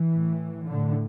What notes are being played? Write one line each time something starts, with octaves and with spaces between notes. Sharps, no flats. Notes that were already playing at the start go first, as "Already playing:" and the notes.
Already playing: E3
A2
A2 D3